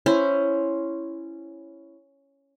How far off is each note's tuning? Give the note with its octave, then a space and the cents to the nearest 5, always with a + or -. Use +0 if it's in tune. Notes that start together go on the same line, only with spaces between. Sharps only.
C#4 +0 E4 +10 C5 +0